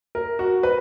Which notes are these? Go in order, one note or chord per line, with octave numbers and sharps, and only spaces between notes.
A#4
F#4
B4